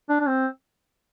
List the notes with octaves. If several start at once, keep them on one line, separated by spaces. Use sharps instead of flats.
D4
D4
C4